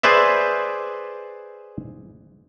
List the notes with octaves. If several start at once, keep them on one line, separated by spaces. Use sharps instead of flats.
G#4 B4 C5 D5 E5